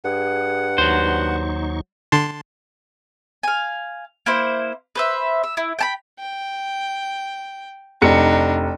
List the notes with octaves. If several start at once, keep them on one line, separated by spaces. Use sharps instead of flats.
G2 G#4 F#5
D#2 F#3 D#4 C5 C#6
D3 A5 C6
F5 G#5
A#3 E4 C5
B4 C5 E5
E5
E4
G5 A5 B5
G5
F1 D4 D#4 C#7